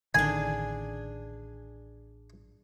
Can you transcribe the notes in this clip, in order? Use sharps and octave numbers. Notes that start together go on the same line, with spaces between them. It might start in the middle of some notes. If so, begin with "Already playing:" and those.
A1 D3 D#3 D4 G#4 G#5